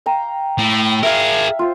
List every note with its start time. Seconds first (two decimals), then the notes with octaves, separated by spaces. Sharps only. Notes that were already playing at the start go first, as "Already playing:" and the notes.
0.06 F5 G5 A#5
0.58 A2
1.03 G#4 A#4 E5 F5
1.59 F4 C5